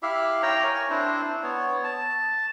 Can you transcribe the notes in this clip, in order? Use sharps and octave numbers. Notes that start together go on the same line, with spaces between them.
E4 G4 E5 F5
C#5 G5 A#5
A#4 C#5 G#5
C4 D4 E4 C5
B3 C#5
A5